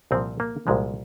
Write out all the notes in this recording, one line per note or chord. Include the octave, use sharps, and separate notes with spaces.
C2 A#2 F3 C4
A#3
C2 A#2 F3 G#3